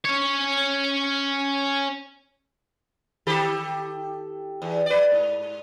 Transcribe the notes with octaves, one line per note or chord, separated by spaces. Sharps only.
C#4 C#5
D#3 G4 A4
E2
B4 D5
G#2